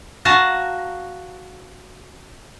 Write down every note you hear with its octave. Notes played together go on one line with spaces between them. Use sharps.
F#4 F5 A5 A#5